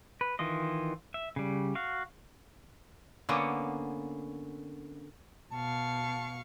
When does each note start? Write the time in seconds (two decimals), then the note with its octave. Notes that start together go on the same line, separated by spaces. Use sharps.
0.21 B4
0.39 D#3 E3 F4 D#5
1.14 E5
1.36 C#3 G3
1.75 F#4 F5
3.29 D3 A#3 B3 C#4
5.53 B2 F5 A5 C#6